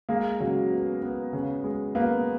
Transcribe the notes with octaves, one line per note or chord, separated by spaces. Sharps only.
G#3 A#3
C#3 F#3
B3
B3
C#3
G#3
A#3 B3